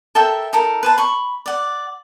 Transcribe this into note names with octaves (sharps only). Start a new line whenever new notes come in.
A4 A#4 E5 G5
D#4 A4 A#4
B4 C5 A5
B5 C#6
D5 F#5